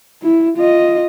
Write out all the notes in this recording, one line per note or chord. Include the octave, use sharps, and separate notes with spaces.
E4
F4 D#5